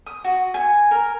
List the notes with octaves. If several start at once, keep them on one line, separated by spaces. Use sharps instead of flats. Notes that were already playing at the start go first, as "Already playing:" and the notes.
D#6
F#4
G#5
A#4